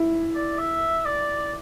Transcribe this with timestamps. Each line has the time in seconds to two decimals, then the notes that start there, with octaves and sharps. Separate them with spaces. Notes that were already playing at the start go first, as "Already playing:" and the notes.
Already playing: E4
0.35 D5
0.58 E5
1.05 D5